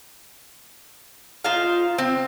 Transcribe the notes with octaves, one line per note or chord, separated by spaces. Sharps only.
D#4 F4 C5 F5
C4